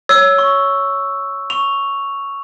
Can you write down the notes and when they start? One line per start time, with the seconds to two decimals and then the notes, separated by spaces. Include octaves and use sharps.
0.09 C#5 E6
0.38 C#6
1.50 C#6 F7